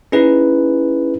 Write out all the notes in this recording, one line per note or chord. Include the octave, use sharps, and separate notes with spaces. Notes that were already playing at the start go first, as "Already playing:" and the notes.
C#4 D#4 E4 G#4 B4